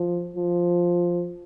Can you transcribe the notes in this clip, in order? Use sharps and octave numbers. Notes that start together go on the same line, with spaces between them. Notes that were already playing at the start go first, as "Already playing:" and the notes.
Already playing: F3
F3